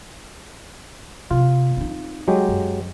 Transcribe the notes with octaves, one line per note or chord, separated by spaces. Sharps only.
C3 F4
C4 D#4
F#3 G#3 G4
F#2